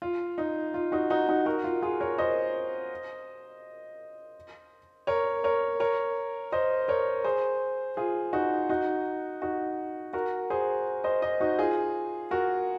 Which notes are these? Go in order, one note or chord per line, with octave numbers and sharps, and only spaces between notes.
F4
D#4
F4
D#4 F#4
D#4 F#4
D#4 F#4
F#4 A#4
F4
F4 G#4
A#4 C#5
C5 D#5
A#4 C#5
A#4 C#5
A#4 C#5
C5 D#5
A#4 C#5
G#4 C5
F4 G#4
D#4 F#4
D#4 F#4
D#4 F#4
F#4 A#4
G#4 C5
C5 D#5
C5 D#5
D#4 F#4
F4 G#4
F#4 A#4